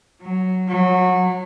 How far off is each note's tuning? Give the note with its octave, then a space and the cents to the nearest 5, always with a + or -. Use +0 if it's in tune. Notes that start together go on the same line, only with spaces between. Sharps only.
F#3 +0
F#3 -20